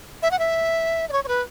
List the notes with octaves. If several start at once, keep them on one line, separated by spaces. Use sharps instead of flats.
E5
F#5
E5
D5
C#5
C#5
B4